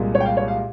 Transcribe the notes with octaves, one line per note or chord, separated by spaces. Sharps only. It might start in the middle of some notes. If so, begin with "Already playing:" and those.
Already playing: C2 A#2 G#3
C#5
G5
F5
C#5
F5